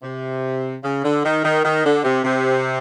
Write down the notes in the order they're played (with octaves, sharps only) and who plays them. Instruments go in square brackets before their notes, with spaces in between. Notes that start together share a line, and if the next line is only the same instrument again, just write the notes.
[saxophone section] C3
C#3
D3
D#3
D#3
D#3
D3
C3
C3